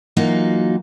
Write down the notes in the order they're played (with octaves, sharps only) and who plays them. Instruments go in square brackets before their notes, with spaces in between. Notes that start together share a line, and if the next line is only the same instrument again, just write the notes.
[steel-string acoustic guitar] E3 F#3 A#3 D#4 F4 F#4